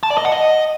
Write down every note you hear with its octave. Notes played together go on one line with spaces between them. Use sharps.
A5
D5
D#5
F#5
D#5